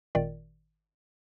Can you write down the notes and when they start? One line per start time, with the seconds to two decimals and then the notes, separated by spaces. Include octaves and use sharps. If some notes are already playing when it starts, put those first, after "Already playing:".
0.15 G#1 A#2 D#3 D5